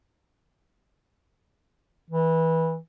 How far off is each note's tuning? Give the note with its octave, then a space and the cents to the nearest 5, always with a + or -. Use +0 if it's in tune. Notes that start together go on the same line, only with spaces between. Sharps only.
E3 -20